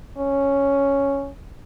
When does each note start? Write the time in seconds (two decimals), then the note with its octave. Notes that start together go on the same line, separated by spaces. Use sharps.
0.18 C#4